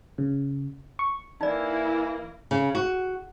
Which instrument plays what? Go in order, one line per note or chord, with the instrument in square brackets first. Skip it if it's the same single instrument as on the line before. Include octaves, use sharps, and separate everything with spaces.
[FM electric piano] C#3
C#6
[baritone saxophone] E3 [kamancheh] A#3 E4 [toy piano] D#4 D5
[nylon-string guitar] C#3
F#4